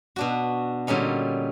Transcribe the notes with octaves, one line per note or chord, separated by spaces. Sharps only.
B2 D4 F#4
A#2 D3 G3 C#4 D#4